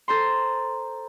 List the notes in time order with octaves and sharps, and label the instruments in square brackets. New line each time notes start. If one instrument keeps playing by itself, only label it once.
[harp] A4 C5 A#5 C6